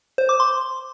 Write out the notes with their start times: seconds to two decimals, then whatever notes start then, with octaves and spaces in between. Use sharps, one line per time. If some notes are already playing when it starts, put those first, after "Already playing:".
0.18 C5
0.29 D6
0.40 C6